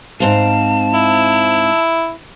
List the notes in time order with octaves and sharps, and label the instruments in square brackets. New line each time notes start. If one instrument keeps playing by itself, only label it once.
[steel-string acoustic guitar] G#2 C4 F5 [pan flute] A5
[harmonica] E4